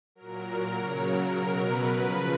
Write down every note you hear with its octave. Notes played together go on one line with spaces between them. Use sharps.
A#2 F#3 A#4
C#3 F#3 C#5
A#4
B2 F#3
B4
C#3 F3